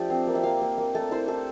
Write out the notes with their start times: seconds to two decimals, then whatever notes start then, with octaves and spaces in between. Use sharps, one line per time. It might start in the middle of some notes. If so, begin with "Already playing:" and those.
Already playing: F3 A3 D4 G4 A4
0.10 C4
0.27 A#3
0.35 E5
0.43 A#3 F5
0.61 A#3
0.78 A#3
0.95 A3 A4
1.11 E4 C5
1.28 E4 A4